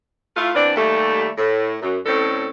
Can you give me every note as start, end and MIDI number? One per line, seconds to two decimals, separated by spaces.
0.37 0.54 57
0.37 0.54 64
0.37 0.54 65
0.54 0.72 52
0.54 0.72 59
0.54 0.72 60
0.54 0.72 62
0.76 1.28 39
0.76 1.28 55
0.76 1.28 57
1.37 1.75 45
1.82 1.98 42
2.06 2.48 45
2.06 2.48 50
2.06 2.48 60
2.06 2.48 61
2.06 2.48 69